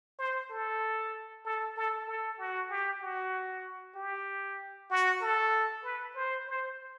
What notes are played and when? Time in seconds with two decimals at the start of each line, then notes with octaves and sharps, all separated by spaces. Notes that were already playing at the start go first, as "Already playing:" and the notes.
0.19 C5
0.50 A4
1.45 A4
1.77 A4
2.08 A4
2.39 F#4
2.70 G4
3.02 F#4
3.95 G4
4.90 F#4
5.21 A4
5.84 B4
6.15 C5
6.48 C5